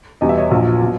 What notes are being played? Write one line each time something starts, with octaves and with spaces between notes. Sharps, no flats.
E2 B2 G3 D#5
E5
C#5 D#5
A#1 A#2 F#3
B2 F#3